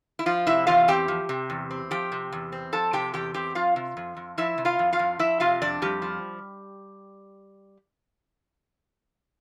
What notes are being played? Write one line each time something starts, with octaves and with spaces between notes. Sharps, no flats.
E4
F3 F4
C3 E4 E5
E2 F4 F5
C4 G4 G5
F3
C3
E2
C4
F3 G4 G5
C3
E2
C4
F3 A4 A5
C3 G4 G5
E2 G4 G5
C4 G4 G5
F3 F4 F5
C3
F2
F2
F3 E4 E5
C3
F4 F5
F2
F4 F5
F2
F3 E4 E5
C3 F4 F5
F2 D4 D5
F2 G3 G4
F3